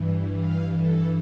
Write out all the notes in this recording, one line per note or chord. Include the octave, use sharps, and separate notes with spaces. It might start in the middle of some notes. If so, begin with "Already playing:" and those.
Already playing: G2 E3
F5
A4